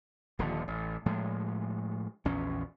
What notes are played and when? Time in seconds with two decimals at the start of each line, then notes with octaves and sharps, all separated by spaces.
0.39 D#1 D#2 D3 F3
0.68 A1
1.06 A2 F3 G#3
2.25 A#1 E2 C#4